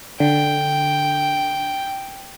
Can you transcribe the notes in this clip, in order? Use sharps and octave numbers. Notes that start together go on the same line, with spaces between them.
D3 G5